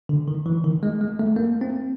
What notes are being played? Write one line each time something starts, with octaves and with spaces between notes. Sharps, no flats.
D3
D#3
E3
D#3
G#3
G#3
A3
A#3
C4